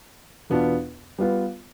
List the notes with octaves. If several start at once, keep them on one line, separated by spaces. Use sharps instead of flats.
E2 B2 B3 D4 F4
G3 B3 F4 B4